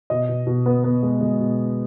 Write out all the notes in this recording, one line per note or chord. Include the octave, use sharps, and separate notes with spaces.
B2 D#5
B2
B2
B3
B3
G#3
G#3
B2